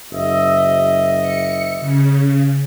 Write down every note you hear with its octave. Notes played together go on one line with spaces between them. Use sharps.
F#1 D#5 E5
C#7
C#3